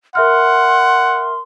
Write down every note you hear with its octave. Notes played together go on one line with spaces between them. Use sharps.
A#4 E5 F#5 C6 F6